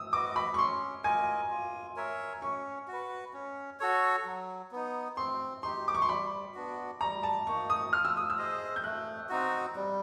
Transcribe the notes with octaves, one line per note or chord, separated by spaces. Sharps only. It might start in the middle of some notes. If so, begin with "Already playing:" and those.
Already playing: D#6 E6
F#4 B4 D#5 D6
B5
C#6
C#4 C6
F4 A#4 D#5 G#5
F4
A#4 C#5 E5
C#4 C#6
F#4
B4
C#4
F#4 A4 C#5
F#3
B3 D#4
C4 C6
D#4 G4 C6
D6
C#6
C6
G3 B5
B3 D4 F#4
G3 A#5
A5
A#3 D#4 C#6
D#6
F4 F6
E6
D#6
E6
G#4 C5 D#5
G6
A3 F#6
C4 D#4 F#4
G3